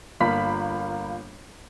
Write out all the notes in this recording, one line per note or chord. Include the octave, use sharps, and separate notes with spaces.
G1 A#3 F4 B5 B6